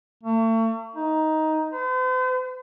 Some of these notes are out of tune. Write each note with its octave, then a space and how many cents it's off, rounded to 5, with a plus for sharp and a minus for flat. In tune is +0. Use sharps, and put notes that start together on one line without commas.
A3 +40
D#4 +10
C5 -45